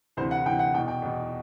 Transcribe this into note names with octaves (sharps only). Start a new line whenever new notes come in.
D2 C3 E3 C5
F#5
D2 C3 E3 G5
F#5
E2 B2 G5
G5
E2 B2